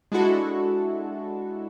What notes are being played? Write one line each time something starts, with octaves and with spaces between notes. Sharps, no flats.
G#3 D4 E4 F#4 A4